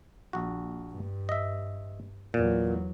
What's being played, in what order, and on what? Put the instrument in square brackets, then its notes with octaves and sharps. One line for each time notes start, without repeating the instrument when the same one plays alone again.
[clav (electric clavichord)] A#1 F#4
[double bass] G2
[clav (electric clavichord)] D#5 E5
[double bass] E2 F#3 [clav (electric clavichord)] A#2